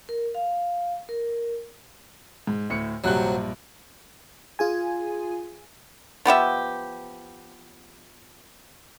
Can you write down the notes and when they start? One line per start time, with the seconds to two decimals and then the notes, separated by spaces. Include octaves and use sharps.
0.09 A#4
0.35 F5
1.09 A#4
2.47 G#2
2.70 D2 A2 C#7
3.04 A#1 G2 C3 F#3 F#6
4.59 F4 G#4 G#5
6.25 F3 B3 G4 E5